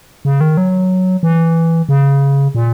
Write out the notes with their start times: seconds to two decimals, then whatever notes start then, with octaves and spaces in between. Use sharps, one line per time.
0.25 C#3
0.41 D#3
0.57 F#3
1.23 E3
1.89 C#3
2.55 A#2